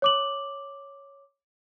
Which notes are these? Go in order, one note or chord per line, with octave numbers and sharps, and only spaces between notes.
C#5 D6 F#7